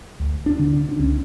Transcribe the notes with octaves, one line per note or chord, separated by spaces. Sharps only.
D2
D4
D3
D4
D4
C#2 C#4